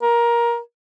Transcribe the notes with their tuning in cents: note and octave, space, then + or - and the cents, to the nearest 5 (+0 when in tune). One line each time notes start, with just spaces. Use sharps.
A#4 +20